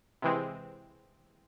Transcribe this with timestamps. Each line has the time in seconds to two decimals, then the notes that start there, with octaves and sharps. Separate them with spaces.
0.22 C3 E3 G#3 C4